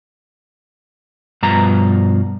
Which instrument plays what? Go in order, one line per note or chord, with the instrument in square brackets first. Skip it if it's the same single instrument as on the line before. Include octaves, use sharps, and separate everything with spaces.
[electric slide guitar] G2 B2 F3 A#5